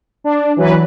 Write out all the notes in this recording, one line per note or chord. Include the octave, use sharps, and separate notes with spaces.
D4
E3 F#3 B4